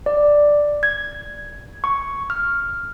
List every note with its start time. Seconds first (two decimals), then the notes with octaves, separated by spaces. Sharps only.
0.06 D5
0.83 G#6
1.84 C#6
2.30 F6